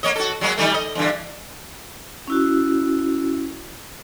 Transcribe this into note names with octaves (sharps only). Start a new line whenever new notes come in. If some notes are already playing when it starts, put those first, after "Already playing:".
A#3 C#5 D#5
F#4 A4
F#3 G#3 A#3
D#3 G3 A3
D#5
E2 G2 D3
C#4 E4 F#4